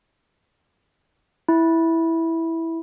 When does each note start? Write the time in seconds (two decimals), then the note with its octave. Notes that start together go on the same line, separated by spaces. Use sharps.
1.49 E4